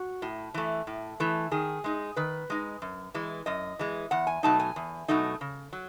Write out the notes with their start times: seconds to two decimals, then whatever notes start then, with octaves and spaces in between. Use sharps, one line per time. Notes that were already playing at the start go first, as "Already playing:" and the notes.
Already playing: F#4
0.22 A2
0.54 E3 A3
0.87 A2
1.20 E3 A3
1.51 D#3 G#4
1.84 G#3 D#4
2.16 D#3 B4
2.50 G#3 D#4
2.82 F#2
3.14 E3 G#3
3.46 F#2 D#5
3.79 E3 G#3
4.11 E2 F#5
4.27 G#5
4.43 B2 F#3 A3 D#4 A5
4.60 G#5
4.76 E2
5.08 B2 F#3 A3 D#4
5.41 C#3
5.73 F#3